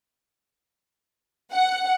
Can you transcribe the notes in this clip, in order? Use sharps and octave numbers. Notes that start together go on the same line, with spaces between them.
F#5